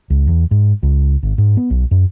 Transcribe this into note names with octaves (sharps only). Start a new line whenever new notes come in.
C#2
E2
G#2
C#2
G#1
G#2
B3
B1
F#2